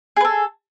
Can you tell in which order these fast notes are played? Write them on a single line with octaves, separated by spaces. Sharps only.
G#4 B4 A4